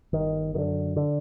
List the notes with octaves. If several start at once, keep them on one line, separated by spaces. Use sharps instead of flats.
G1 D#3
F#2 D3 D#3
D3